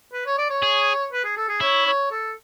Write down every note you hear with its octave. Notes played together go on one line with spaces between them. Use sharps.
B4
C#5
D5
C#5
G#4
B4
G#4
A4
G#4
E4 C#5
C#5
A4